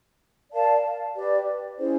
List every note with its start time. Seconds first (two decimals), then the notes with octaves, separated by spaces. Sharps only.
0.52 A#4 D5 F5 A5
1.15 G4 B4 D5
1.77 C#4 E4 G#4 C5